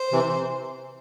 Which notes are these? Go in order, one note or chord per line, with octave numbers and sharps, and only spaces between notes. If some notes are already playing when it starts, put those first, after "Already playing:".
Already playing: C5
C3 E3